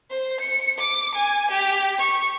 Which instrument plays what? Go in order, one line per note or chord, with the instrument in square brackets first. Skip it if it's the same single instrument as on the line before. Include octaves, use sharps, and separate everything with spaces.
[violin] C5
C#7
D6
G#5
G4
C#6